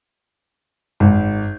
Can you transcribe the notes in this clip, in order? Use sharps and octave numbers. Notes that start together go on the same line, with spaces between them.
G#1